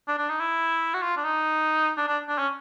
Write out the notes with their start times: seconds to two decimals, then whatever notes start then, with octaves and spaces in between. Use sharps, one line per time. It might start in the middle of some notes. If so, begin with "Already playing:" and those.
0.08 D4
0.18 D4
0.29 D#4
0.40 E4
0.94 F#4
1.02 F4
1.17 D4
1.24 D#4
1.98 D4
2.08 D4
2.29 D4
2.38 C#4